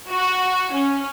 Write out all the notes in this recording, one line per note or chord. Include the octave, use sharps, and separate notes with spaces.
F#4
C#4